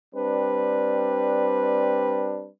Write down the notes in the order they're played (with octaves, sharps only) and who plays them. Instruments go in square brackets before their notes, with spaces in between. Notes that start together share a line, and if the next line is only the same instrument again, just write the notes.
[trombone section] G3 C4 D4 B4